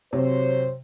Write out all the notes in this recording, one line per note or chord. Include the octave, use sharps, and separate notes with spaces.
C3 F#3 C5 C#5